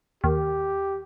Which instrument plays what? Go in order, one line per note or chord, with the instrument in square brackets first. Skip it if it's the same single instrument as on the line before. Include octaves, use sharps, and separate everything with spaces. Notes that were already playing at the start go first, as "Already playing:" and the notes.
[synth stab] D#2 [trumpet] G4